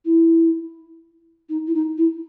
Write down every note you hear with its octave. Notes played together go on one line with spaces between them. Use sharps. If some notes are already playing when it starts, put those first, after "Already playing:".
E4
D#4
E4
D#4
E4